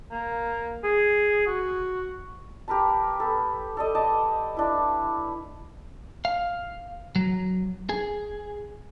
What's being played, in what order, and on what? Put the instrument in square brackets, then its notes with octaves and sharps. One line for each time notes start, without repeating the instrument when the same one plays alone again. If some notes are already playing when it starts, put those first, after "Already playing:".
[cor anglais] A#3
G#4
F#4
[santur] G4 A#4 B4 A5
B3 A4
A4 D5 D#5
D5 D#5 A5
D4 E4
[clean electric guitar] F5
F#3
G#4